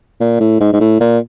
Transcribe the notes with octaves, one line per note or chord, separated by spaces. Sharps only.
A#2
A2
G#2
G#2
A2
A#2